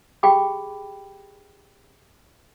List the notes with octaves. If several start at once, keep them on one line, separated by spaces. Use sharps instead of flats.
G4 G#4 G5 B5 D6